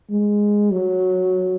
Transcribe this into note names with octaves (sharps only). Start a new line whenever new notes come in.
G#3
F#3